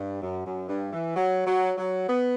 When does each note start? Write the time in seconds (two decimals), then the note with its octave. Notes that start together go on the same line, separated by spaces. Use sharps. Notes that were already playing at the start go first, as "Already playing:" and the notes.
Already playing: G2
0.23 F#2
0.46 F#2
0.69 G2
0.93 E3
1.16 F#3
1.47 F#3
1.78 F#3
2.09 B3